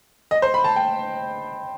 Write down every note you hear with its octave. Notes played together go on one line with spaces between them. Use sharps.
D#5
C5
B5
A5
G5